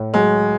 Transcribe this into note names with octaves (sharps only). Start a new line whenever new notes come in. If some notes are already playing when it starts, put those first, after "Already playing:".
Already playing: A2
F#3 G#3